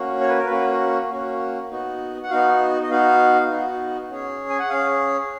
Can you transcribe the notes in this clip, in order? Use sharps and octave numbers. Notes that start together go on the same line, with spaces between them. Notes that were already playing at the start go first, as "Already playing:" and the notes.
Already playing: A#3 C#4 F#4
C#5
B4
A#4
A#3 C#4 F#4 B4
A#3 C#4 F#4
B3 D#4 F#4
F#5
B3 D#4 F#4 F5
D#5
B3 D#4 F#4 F5
B3 D#4 F#4
C#4 G#4
G#5
F#5
C#4 G#4 F5